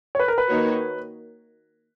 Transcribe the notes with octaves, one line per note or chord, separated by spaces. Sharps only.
C#5
B4
A#4
B4
D#3 A#3 D#4 F#4 C#5